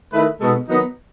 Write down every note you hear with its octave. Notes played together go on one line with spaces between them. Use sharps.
D#3 A3 E4 B4
B2 G#3 B3 D#4 A4
D#3 F#3 B3 D#4